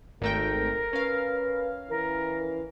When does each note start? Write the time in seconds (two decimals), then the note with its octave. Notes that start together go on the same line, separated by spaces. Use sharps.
0.21 G#1 A3 A#4 G5
0.93 C#4 B4 F5
1.89 E3 A#4